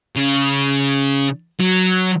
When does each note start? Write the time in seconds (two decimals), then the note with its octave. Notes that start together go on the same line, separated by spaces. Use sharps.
0.16 C#3
1.60 F#3